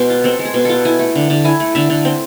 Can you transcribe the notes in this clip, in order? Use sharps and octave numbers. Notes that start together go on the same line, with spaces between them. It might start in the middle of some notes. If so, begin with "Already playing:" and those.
Already playing: B2 G#3 C5
F4
C4 A4
G#3
G#4
B2
F4 A4
E4 G#5
A3
D3
D3
E4 G#5
A3
D3 E5
D3
C4